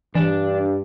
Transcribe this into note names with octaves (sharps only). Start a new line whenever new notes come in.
G2 E3 D4